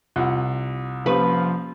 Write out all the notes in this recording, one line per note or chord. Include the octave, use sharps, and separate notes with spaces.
C2 F4 F#5 F#6
F3 A#3 C#4 G4 B4